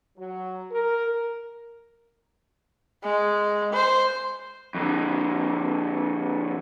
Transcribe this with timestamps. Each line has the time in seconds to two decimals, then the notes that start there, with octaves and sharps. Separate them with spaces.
0.18 F#3
0.71 A#4
3.03 G#3
3.73 C5
4.75 F2 D3